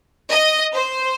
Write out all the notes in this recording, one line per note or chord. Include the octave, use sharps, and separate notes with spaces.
D#5
C5